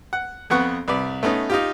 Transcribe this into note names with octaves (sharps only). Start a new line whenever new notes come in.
F#5
F2 B3 F#5 C#6
C2 B4 D5
A3 B3 C#4 D#4
D#4 F4 G4